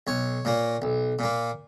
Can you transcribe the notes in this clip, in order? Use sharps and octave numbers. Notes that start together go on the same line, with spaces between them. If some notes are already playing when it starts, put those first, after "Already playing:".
B1 C#5
A#2 A#3
B1
A#2 A#3